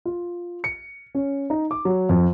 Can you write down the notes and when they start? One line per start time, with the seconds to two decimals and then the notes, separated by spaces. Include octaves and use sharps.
0.05 F4
0.64 C#7
1.15 C#4
1.50 D#4
1.71 D6
1.85 F#3
2.09 F2